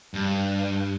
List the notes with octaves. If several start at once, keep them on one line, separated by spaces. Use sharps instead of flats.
G2